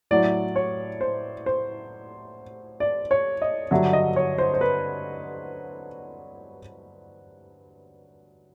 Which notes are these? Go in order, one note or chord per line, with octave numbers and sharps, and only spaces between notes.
A2 F#3 D5
C#5
C5
C5
D5
C#5
D#5
G2 D3 F#3 E5
D#5
C#5
C5
C5
B4